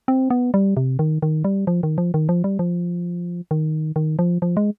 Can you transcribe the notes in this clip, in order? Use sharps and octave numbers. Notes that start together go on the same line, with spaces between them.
C4
B3
G3
C3
D#3
D#3
G3
F3
D#3
F3
D#3
F3
G3
F3
D#3
D#3
F3
F3
G#3